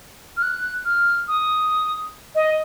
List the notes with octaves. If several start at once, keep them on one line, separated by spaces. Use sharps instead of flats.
F6
F#6
F6
D#6
D#5